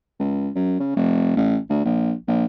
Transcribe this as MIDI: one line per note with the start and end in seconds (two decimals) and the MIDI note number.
0.20 0.50 37
0.56 0.76 42
0.80 0.92 49
0.96 1.36 29
1.37 1.58 33
1.70 1.81 38
1.85 2.13 34
2.28 2.45 34